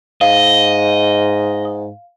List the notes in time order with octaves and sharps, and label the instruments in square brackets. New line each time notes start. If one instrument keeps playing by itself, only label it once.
[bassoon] G#2 [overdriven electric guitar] D#5 [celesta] F5